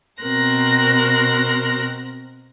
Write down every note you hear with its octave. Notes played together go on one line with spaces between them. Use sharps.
B2 C4 A#4 F#6 A#6